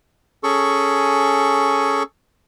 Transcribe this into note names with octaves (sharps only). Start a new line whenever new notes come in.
C#4 G#4 A4 C#6